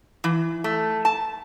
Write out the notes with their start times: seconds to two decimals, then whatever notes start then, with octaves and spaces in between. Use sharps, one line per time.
0.24 E3
0.64 A3
1.05 A5